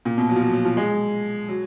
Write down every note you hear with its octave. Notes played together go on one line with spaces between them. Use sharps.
A#2
B2
F#3
F3
F#3
F#3
F3
G#3
F#3